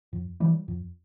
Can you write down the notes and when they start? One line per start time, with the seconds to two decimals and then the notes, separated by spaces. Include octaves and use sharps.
0.13 F2
0.40 E3 G3
0.68 F2